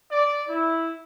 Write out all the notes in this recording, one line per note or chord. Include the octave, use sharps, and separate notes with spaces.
D5
E4